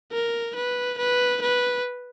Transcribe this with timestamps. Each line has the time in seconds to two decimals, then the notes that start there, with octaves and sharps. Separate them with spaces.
0.12 A#4
0.55 B4
0.98 B4
1.42 B4